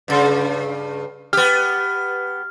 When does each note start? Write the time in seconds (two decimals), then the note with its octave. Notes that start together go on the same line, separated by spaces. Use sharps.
0.08 G2 C#3
1.33 B3 G4 F6